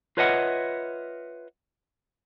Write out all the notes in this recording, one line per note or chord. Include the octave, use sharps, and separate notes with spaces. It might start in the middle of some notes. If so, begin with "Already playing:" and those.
F4 B4 C#5 D#5 E5 F#5